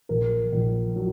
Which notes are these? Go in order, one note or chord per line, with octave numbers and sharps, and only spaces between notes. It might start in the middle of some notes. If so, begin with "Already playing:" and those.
A#1 A#4
A#1
F#3